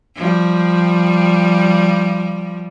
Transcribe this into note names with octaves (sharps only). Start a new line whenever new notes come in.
F3 G3